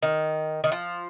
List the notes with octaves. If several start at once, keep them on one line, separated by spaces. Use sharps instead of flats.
D#3
D#3
F3